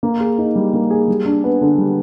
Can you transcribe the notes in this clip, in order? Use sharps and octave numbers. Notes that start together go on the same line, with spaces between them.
A#3
G#4
D#4
G3
A#3
G#4
G3
D4
B3
D3
G3